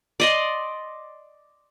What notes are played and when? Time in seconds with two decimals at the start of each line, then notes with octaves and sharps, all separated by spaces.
0.20 D5 D#5 C6